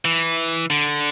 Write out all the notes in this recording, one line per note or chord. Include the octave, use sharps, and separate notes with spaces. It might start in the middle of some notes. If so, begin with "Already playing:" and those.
E3
D3